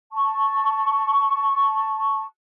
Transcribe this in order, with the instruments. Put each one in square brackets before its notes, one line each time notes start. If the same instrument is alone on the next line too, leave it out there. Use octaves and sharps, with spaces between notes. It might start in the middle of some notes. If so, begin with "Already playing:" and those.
[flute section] A5 C#6